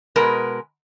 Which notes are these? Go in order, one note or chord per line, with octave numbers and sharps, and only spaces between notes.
B2 G#3 A#4 B4